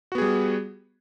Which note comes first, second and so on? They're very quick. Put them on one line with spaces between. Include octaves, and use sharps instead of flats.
F#4 B3 G#4 G3